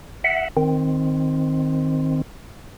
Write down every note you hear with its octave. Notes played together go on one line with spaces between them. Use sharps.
E5 F#5
D#3 C4